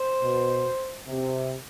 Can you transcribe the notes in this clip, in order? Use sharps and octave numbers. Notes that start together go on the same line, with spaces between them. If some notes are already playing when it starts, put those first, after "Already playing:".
Already playing: C5
B2
C3